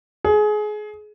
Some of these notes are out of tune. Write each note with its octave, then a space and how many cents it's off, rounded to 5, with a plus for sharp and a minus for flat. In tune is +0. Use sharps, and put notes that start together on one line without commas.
G#4 +25